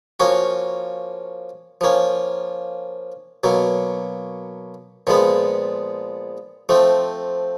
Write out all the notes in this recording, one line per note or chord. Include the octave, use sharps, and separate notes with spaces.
F3 A#3 C#4 F#4
F3 A#3 C#4
B2 F#3 A#3
A#2 F3 G#3 B3
F3 A3 C4